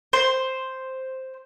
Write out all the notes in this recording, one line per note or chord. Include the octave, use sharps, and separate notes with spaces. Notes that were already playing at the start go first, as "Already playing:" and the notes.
C5